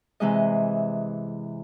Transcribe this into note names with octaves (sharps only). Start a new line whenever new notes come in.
C3 E3 G#3 D#5